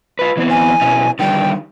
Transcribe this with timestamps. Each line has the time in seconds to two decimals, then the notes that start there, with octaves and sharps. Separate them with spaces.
0.19 F4 B4
0.37 E3 B3 C4
0.50 G#5
0.81 B2 C#4 E4
1.19 D3 D#3 G3 G5